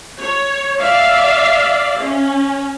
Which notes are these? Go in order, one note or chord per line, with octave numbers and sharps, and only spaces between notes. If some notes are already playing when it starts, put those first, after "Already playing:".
C#5
D5 E5 F5
C#4